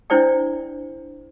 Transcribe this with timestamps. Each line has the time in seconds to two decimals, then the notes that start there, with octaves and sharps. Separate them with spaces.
0.10 D4 E4 C5 D5 G5